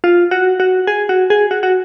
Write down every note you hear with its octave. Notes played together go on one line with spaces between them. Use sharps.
F4
F#4
F#4
G#4
F#4
G#4
F#4
F#4